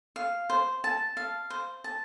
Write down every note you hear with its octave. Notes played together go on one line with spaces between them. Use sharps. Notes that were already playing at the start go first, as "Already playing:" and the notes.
F5
C5
A5
F5
C5
A5